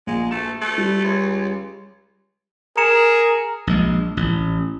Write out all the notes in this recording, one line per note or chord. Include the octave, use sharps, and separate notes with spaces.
A#1 G#3
A3 E7
A3
G3
C#2
G#4 A#4 A#5 C#7 E7
A#1 G#3
A1